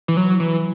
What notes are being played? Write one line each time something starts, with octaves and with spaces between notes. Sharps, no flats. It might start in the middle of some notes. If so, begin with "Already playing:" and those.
E3
F#3
E3